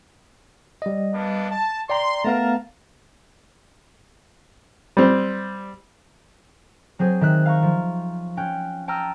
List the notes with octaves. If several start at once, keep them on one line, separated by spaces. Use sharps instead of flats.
G3 D#5
A#3 B3 D4
A5
D5 G5 A#5 C6
A3 B3 A#4 F5 A5 A#5
G3 C4
F#3 C4 G#4 C5
D#3 E5 F#6
F5 A#5 C#6
F3
C#4 G5 F#6
G5 A5 A#5 E6 F6 D#7